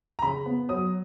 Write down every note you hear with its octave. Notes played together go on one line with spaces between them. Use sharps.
A#5
C#3 B5
B3
F#3 D#6